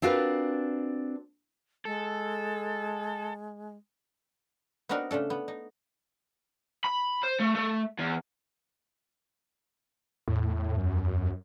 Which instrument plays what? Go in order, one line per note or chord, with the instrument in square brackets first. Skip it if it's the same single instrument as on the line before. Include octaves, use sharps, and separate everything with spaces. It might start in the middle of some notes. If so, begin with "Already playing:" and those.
[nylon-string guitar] C4 D4 F4 F#4 A#4 B4
[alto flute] G#3 [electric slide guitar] A4
[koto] B3 C4 D4 D#4 F#4 A#4
C#3 A3 D4 A4
B3
D#4
[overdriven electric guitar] B5
C5
A3
A3
E2
[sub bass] E2 [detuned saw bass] A2
[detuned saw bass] F#2